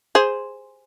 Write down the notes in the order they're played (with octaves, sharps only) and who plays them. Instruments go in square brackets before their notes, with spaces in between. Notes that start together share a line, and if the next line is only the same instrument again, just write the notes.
[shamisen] G#4 C5